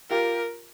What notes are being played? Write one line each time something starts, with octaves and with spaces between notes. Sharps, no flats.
F4 G4 A#4